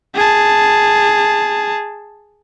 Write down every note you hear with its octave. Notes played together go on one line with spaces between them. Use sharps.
G#4 A5